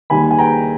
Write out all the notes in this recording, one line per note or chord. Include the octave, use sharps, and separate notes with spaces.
D#2 D#3 G3 G#5 B5
G#5
G5 A#5